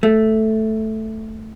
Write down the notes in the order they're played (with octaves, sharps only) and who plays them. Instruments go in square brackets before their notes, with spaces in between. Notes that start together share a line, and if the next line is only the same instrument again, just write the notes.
[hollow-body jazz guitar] A3